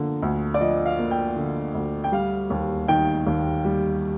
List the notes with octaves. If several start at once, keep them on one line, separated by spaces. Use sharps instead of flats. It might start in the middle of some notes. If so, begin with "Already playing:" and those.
Already playing: D3 F3 A#3
D2
D5
F3 D#5
F5
A#3
G5
D3
D2
G5
G3 F5
D#2
D#3 G5
D#2
G3